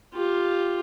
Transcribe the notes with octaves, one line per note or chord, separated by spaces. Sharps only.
F4 G4